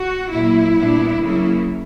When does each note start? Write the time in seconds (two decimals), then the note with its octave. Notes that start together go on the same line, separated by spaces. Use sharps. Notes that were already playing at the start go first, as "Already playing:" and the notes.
Already playing: F#4
0.31 A#2 F#3 A#3 E4
0.76 A#2 G3 B3 D4
1.22 C#3 F#3 A#3 E4